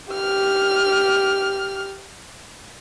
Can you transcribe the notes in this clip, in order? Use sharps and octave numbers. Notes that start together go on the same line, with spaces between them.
G4 F6